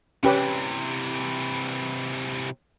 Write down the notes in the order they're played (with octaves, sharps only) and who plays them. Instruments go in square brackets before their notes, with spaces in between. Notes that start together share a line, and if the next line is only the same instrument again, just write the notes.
[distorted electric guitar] C3 E3 [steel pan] C#4 G4 B4